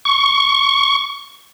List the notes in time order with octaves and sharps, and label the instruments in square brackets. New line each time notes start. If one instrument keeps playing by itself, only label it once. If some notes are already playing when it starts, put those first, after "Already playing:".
[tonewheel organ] C#6